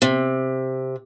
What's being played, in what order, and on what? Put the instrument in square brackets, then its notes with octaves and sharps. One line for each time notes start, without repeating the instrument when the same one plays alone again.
[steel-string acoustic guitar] C3